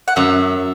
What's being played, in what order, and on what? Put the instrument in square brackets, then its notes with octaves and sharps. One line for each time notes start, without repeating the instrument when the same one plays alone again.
[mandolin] F#5
[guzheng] F#2 [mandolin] E5